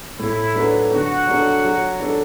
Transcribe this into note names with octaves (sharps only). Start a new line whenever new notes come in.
A2 E4
F#3 A3 D4 B4
D3 F#4
F#3 D4 A4
F#3
D4 A4